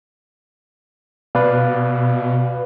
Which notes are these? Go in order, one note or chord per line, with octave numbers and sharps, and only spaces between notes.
B2 B4 D5 F5